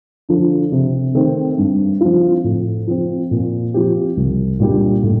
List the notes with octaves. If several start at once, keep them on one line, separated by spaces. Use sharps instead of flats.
D3 F3
C3
D#3 A3 C4
G2
F3 C4 F4
A2
F3 C4
A#2
F3 C4 G4
C2
A#2 G3 D4 G4
A2